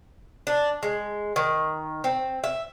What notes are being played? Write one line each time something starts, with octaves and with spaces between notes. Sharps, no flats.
D4
G#3
D#3
C4
E5